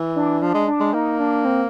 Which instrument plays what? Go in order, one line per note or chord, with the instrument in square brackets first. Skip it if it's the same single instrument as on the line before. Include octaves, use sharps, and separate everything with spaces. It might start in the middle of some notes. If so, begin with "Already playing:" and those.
Already playing: [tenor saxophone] E3
[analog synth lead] D4
[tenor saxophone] F3 [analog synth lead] D4
[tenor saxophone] G#3
[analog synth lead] D4
[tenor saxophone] G#3
[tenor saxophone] A#3 [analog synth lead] D#4
[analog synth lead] D4
C4